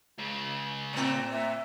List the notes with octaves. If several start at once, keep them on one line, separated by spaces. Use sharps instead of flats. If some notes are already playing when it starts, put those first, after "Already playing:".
C#2 C#3
A2 C4
E5